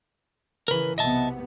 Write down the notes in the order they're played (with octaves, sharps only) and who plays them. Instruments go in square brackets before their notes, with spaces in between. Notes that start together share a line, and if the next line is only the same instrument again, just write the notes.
[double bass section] C#3 E3 [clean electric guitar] A#4 B4
[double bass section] B1 C3 B3 [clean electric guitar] D#5 E5 A5